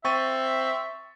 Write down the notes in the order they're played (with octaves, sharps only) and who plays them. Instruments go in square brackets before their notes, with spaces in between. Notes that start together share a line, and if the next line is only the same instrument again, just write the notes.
[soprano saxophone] C4 [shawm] E5 [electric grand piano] C#6 A6 D#7